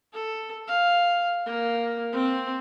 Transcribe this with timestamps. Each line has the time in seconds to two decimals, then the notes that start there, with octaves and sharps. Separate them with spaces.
0.13 A4
0.68 F5
1.46 A#3
2.12 C4